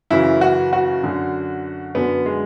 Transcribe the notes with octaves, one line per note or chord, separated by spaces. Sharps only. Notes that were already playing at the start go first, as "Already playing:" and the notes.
F#2 C#3 E3 E4
F#4
F#4
F#2 D3
F#2 D3 B3
G#3